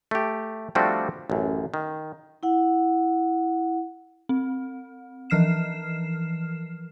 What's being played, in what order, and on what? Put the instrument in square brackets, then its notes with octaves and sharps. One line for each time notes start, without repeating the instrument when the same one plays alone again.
[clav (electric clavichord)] A3 G4
F3 G3 A3 C4 D4 F#4
A1 F#2
D#3
[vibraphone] E4 F#5
[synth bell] C4
E3 F3 F6 C7 E7